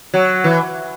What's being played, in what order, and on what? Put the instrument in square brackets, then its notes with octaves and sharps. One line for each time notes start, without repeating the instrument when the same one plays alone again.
[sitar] F#3
E3